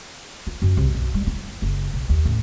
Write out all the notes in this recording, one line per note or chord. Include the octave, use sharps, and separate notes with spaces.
F4
F#2
C2
B1
G3
E4
F#1
B1
D#2
A1